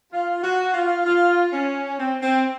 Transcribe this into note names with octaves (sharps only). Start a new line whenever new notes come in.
F4
F#4
F4
F4
C#4
C4
C4